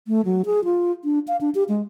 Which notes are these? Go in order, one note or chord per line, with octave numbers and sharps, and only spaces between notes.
A3
F#3
G#4
F4
D4
F5
D4
G4
G#3